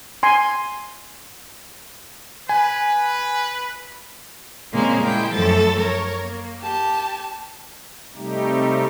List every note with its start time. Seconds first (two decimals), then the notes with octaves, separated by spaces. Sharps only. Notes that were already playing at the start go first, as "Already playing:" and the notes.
0.23 G#5 C6
2.49 B4 G#5
4.73 A#2 C#3 G#3 A#3 C4 C#4
5.03 G#3 E4 G5
5.33 F#2 F3 A3 A4 A6
5.79 A#4 C#5
6.20 A#3
6.62 G4 A5
8.16 C3 G3 A3 D#4 G4